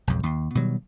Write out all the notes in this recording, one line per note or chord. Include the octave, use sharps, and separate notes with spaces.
B1 F2 G#2
D#2
B2 D#3 F#3 G3